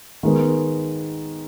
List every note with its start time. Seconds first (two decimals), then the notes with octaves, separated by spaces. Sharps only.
0.23 D#3 G#3 B3